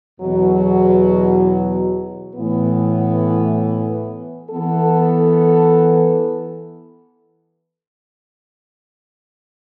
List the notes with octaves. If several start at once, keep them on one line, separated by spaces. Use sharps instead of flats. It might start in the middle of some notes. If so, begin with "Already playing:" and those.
E2 B2 F#3
A2 E3 B3
E3 B3 A4